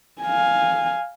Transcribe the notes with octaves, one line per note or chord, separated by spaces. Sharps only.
F5 G#5